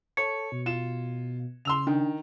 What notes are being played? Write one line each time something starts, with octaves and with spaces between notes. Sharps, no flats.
A4 C#5 C#7
B2
F4 E7
C#3 C6 E6 F7
D#3 D4